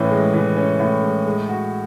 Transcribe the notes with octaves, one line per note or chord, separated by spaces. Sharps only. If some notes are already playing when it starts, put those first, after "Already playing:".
Already playing: A2 E3 C#4
G#3
E3
C#4
A2
G#3
G#3
F#4